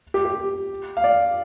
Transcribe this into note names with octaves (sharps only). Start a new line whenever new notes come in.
G4
G4
F5
D5